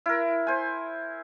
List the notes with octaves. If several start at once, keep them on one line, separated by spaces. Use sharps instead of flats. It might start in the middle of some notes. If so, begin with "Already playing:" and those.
E4 A#4
C5 G#5